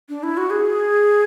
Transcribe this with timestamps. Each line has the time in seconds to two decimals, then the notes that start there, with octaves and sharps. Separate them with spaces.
0.09 D4
0.23 E4
0.37 F#4
0.50 G#4